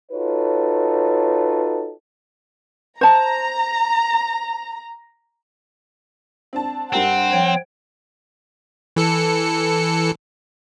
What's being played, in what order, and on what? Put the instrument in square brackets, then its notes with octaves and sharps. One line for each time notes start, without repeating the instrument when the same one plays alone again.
[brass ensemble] D#4 F4 F#4 A4 B4 C#5
[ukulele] C5 A5 [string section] A#5
[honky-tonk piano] C4 D4 A5
[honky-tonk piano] G2 G3 A#4 [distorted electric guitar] C4 [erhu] F#5
[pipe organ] F3 C#5 G5
[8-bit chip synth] E3 A4 C#7